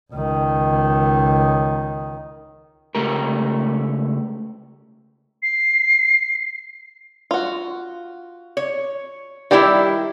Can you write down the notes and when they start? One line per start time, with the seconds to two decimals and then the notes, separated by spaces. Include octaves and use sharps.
0.13 C#2 D#3
2.95 C#2 A3 G4 A#4
5.43 C7
7.31 F4 F#4
8.57 C#5
9.51 D#3 G3 E4 G4 E5